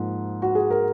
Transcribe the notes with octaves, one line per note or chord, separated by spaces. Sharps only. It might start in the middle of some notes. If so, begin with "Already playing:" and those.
Already playing: G#2 F3 A#3
F#4
G#4
A#4